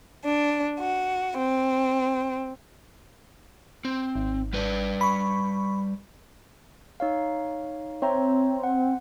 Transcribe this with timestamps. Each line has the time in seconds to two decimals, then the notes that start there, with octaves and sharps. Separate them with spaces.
0.25 D4
0.79 F#4
1.38 C4
3.85 C4
4.15 G#1
4.53 G3 B4 D5
5.01 B5 C#6
7.00 D#4 C#5 F5
8.02 C4 C#5 E5 A#5
8.63 F#5